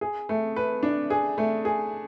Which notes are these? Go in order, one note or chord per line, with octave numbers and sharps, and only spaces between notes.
G#4
A3
B4
D4
G#4
A3
G#4